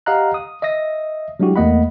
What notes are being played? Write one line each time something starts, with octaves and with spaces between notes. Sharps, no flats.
G4 D#5 F5 F#5 A#5 F#6
D#6
D#5 E5 D#6 A#6
F#3 G#3 D4 E4 F#4 G4
E2 A3 A#3 D#5 F#5 B5